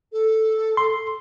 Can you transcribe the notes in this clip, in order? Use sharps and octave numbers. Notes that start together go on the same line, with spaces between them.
A4
C6